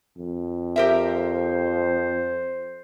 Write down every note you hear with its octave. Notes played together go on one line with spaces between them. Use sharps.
F2
G4 A#4 C5 E5